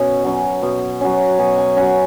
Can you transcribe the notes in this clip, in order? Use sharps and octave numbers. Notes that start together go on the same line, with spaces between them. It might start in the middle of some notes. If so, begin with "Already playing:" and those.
Already playing: B2 C#4
F#3 C#4
B2
F#3 C#4
B2 G#5
G#5
F#3 C#4 F#5